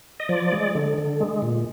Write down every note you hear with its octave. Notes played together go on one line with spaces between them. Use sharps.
D#5
F3 D5
G#3
D3
D3
G#3
A#2